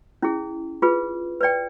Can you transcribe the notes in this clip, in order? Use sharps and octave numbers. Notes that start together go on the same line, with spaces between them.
C#4 E4 G#4
F4 G#4 B4
B4 D5 G5